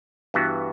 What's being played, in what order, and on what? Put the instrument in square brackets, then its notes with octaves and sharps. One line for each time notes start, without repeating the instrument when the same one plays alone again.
[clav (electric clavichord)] G2 E3 B3 F#4